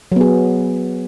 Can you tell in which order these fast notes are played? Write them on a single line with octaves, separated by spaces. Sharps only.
F#3 B3 G#4